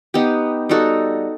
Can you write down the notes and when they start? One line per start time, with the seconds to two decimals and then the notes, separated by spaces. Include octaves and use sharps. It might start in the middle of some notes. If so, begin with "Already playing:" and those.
0.14 B3 D#4 G4
0.69 G3 D#4 F#4 A4